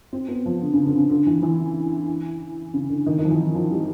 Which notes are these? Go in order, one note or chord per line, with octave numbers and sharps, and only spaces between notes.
C4
B3
F3
D3
C#3
D3
C#3
D3
E3
E3
C#3
D3
D#3
D#3
F3
E3
F3
F3
G3